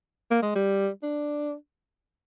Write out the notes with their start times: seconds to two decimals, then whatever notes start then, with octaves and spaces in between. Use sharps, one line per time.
0.31 A#3
0.43 G#3
0.56 G3
1.03 D4